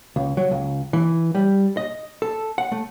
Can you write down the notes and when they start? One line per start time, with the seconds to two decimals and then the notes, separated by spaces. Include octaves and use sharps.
0.16 C#2
0.37 F#3
0.51 C#2
0.93 E3
1.35 G3
1.77 D#5
2.22 A4
2.58 F#5
2.72 A3